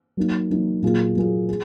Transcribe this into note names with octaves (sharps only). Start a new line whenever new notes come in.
F#3 A#3 D#4
F#3 A#3 D#4
A#2 F#3 A#3 F4 G#4
A#2 F#3 A#3 F4 G#4
G#4